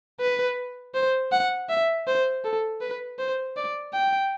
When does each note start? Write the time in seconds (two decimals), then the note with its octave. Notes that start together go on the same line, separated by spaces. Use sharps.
0.20 B4
0.95 C5
1.32 F#5
1.69 E5
2.07 C5
2.44 A4
2.81 B4
3.19 C5
3.57 D5
3.94 G5